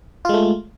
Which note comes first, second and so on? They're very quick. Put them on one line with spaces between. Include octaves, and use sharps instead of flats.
F4 G#3 A3